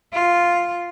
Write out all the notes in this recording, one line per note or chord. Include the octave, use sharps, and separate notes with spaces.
F4